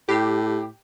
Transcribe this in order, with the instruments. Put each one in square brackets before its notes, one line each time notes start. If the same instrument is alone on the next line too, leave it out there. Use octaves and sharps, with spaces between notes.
[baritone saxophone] A2 [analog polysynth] G4